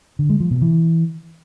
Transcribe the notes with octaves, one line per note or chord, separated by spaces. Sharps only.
D3
G#3
F3
B2
E3